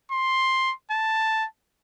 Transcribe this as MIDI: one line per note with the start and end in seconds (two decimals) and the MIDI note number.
0.12 0.73 84
0.91 1.46 81